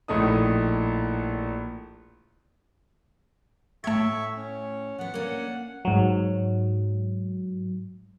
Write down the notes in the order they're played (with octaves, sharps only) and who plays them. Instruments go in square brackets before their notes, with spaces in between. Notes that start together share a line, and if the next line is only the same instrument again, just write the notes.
[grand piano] A#1 A2 A3 D#4 D#6
[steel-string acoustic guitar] A2 C#5 G5 [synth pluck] A3 G#6 [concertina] E5 C#6
[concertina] C#4
[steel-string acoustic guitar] F3 B3 [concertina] F#5
[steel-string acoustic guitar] A#3 C#4 D4
[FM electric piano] G#2 F#3